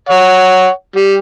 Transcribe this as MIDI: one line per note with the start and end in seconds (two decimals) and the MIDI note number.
0.09 0.69 73
0.09 0.69 78
0.96 1.16 55